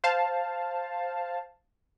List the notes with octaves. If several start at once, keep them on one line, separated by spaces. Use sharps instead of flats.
C5 F5 A5